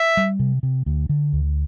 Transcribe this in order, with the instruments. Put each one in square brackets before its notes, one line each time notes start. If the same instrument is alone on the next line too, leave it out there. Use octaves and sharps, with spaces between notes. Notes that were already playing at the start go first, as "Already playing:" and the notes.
Already playing: [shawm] E5
[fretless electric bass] G3
C3
C3
D2
D3
D2